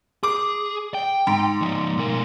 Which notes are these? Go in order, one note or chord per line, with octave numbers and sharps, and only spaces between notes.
G#4 D6
G5
G#2
F3 G#3
B2 A#4